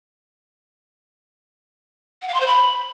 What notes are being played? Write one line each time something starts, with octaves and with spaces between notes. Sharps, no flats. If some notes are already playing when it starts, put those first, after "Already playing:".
F#5
F5
C6
C5
B5